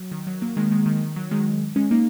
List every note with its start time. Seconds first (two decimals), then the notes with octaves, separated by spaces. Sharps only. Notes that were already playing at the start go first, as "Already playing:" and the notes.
Already playing: F#3
0.12 D#3
0.27 F#3
0.41 F#3 A#3
0.57 D#3 G#3
0.71 D#3 G#3
0.86 D#3
1.01 D#3
1.16 F#3
1.31 D#3 G#3
1.76 G#3 C#4
1.91 A#3 D#4